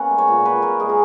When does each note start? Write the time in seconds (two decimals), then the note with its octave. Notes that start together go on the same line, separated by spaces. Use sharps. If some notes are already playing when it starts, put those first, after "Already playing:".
Already playing: A#3 B3 C#4 F#5
0.10 G#3
0.18 C#5
0.28 A#2
0.45 A#2 B4
0.62 B3 A#4
0.80 G#3 G#4
0.89 A#4